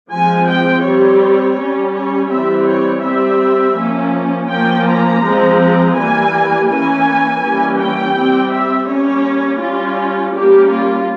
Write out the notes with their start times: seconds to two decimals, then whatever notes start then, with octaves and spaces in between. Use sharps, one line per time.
0.10 F3 G#3 C4 G#5
0.47 G5
0.83 G3 C4 C#5
1.56 G3 C#4
1.93 C#5
2.30 E3 G3 C4 E5
2.67 C#5
3.03 G3 C4 E5
3.76 F3 A#3 C#4
4.49 F3 A#3 C#4 G5
4.86 A#5
5.22 F3 G#3 C4
5.59 A#5
5.95 E3 G3 A#3 G#5
6.68 E3 A#3 C#4 G#5
7.41 E3 G3 A#3 C#4
7.78 G5
8.14 G3 C4
8.51 E5
8.87 G3 A#3 C#4 C#5
9.60 G3 C#4 F4
10.33 G3 A#3 C#4 G4
10.70 F4